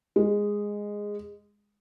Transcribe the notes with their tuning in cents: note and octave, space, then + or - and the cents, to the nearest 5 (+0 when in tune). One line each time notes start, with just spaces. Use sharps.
G#3 -10